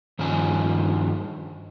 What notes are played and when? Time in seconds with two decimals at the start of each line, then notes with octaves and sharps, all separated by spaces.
0.19 G2 D#3 F3 C#4 G#5